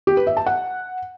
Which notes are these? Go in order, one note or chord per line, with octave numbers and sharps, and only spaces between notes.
G4
B4
E5
A5
F#5